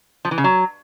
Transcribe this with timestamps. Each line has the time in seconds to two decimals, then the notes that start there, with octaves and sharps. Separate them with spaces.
0.25 F3
0.31 E3
0.38 C#3
0.44 F#3